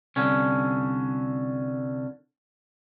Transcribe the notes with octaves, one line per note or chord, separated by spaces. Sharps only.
C2 D3 C#4